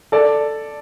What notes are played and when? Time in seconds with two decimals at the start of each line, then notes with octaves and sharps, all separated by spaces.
0.12 A4 D5